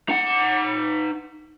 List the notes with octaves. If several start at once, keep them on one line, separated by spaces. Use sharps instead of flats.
D#4 F#5